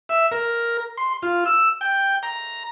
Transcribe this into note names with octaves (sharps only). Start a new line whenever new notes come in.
E5
A#4
C6
F4
E6
G5
A#5